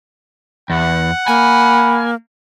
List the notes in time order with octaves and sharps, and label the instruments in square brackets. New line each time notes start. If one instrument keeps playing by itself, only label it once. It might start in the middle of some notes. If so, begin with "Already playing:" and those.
[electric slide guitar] E2 [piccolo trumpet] F#5
[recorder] A#3 [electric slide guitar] G#5 [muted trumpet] B5